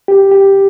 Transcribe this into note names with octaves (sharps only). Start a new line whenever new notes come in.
G4
G4